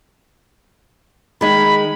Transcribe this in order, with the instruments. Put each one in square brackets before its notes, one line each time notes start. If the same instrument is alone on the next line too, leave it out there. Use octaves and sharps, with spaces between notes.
[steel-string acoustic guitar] D#3 G#3 D#4 [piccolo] B5